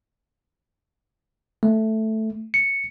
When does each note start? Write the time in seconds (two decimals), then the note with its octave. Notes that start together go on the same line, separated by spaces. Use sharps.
1.63 A3
2.54 C#7